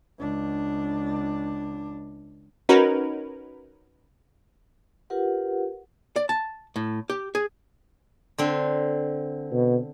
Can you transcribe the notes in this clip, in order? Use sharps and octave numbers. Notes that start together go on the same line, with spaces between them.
C#2 D4
C#4 D#4 F#4 A#4 B4
F4 G4 A#4 B4 F#5
D5
A5
A2
G4
G#4
D3 C4
B2